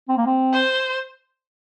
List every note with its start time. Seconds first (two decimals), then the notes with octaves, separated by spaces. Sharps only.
0.09 C4
0.17 A#3
0.26 C4
0.53 C5